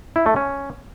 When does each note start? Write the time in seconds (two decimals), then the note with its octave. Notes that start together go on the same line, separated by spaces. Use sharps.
0.16 E4
0.26 A3
0.36 C#4